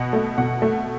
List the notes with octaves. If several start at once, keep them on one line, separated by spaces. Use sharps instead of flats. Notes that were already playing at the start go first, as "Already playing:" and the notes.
Already playing: B2 F#5
A3
B2 F#5
A3